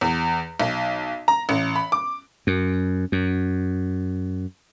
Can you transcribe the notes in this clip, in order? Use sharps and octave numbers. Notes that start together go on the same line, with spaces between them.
E2
B1
A#5
A1
B5
D6
F#2
F#2